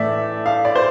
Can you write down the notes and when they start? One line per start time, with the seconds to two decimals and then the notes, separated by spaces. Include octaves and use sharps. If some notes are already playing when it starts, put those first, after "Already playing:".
Already playing: A2 E3 A3 D5 E5
0.46 F5
0.65 D5
0.75 C5